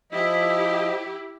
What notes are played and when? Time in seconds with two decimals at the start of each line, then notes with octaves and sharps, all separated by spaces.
0.12 F3 E4 G4 D#5